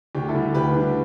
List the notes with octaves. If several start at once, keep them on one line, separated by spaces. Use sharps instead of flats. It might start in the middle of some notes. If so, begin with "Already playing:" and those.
D2 G4
E4 A4
D3 G3
D2 G4 B4
D3 G3